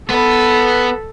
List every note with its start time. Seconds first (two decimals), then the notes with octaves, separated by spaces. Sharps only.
0.10 B3 A4 B4